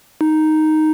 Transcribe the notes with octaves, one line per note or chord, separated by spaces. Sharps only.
D#4